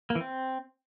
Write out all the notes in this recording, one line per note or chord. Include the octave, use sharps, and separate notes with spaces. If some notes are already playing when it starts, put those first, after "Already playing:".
A#3
E3
C4